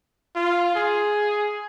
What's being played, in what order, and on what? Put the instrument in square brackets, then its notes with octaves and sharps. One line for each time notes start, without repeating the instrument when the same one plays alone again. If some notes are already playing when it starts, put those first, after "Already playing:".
[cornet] F4
G#4